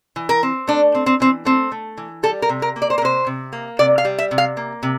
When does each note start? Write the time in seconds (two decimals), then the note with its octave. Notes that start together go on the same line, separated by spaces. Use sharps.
0.16 E3
0.29 A#4
0.43 C4
0.67 A3 D4
0.95 C4
1.06 C4
1.20 E3 C4
1.45 A3 C4
1.72 A3
1.97 E3
2.23 G3 A4
2.42 A#4
2.49 C3
2.62 A#4
2.76 A#3
2.82 D5
2.90 C5
2.98 A#4
3.02 C3 C5
3.27 C3
3.53 A#3
3.79 C3 D5
3.98 F5
4.05 G3
4.18 E5
4.31 C3
4.38 F5
4.57 A#3
4.83 C3